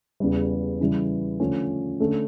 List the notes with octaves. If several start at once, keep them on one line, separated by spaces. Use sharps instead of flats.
E2 C#3 G3
C#3 E3 G3
D3 F3 A3 C#4
D3 A3 C#4